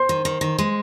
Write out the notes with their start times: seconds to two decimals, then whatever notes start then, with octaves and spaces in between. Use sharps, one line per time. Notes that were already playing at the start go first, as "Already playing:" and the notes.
Already playing: C5 C6
0.09 D#3
0.25 D#3
0.41 D#3
0.59 G#3